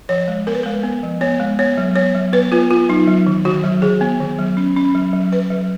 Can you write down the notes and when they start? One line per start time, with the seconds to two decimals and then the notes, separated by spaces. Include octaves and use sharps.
0.09 F3 C#5
0.28 G#3
0.47 B3 A#4
0.54 B4
0.63 G#3 A#4
0.83 B3
1.03 F3
1.21 B3 C#5
1.40 G#3
1.59 B3 C#5
1.78 F#3
1.96 B3 C#5
2.15 F#3
2.33 B3 B4
2.52 B3 F4
2.71 B3 F4
2.89 F#3 D#4
3.08 F#3
3.27 D#3
3.45 D#3 F#4
3.64 F#3
3.82 D#3 G#4
4.01 B3
4.20 D#3
4.39 F#3
4.57 C#4
4.77 C#4
4.95 F#3
5.13 F#3
5.32 F#3 B4
5.50 F#3